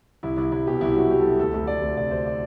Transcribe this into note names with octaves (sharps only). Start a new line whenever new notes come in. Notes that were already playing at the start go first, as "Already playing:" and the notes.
C2 E4
C2 E4
C2 E4
B2 G4
C2 E4
F#3 F#4
F#3 G4
A4
F#3
D2 A4
D2
D2 D5
D2
C3 D5
D2 C5
D5